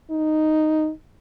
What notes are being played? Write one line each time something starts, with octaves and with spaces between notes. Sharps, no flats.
D#4